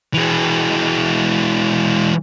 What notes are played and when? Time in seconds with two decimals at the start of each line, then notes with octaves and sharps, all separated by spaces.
0.14 E3 G#3